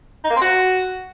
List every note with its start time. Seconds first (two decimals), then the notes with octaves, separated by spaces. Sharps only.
0.24 D#4
0.30 A#3
0.36 C4
0.42 F#4